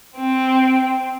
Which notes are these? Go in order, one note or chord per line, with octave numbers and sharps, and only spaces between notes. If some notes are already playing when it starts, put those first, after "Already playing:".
C4